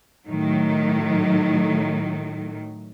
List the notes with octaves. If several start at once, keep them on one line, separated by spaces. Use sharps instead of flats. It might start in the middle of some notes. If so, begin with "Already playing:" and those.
A2 D#3 F#3